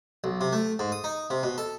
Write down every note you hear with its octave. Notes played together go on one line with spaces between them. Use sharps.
B1
C3
A3
G#2
D#6
D#4
C3
B2
A4